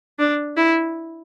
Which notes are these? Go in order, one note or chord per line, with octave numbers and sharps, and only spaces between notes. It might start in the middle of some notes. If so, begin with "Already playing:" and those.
D4
E4